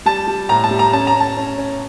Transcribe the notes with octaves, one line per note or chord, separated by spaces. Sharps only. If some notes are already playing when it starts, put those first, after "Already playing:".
G3 A5
G3
A2 A#5
A5
G3
A#5
C#4 A5
A#5
C#4
A5
C#4
C#4